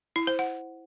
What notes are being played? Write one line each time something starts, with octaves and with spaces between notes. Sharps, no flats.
E4
C5
F#5